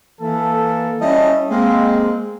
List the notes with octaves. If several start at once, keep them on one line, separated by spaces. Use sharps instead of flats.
E3 A#3 A4
G3 C#4 E4 D#5 E5 A5
G#3 A#3 C4